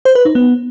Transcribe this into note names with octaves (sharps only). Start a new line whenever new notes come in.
C5
B4
D#4
B3